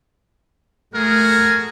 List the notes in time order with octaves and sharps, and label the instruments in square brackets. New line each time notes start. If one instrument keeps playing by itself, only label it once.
[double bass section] A3 [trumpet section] F#4 G#4 A#4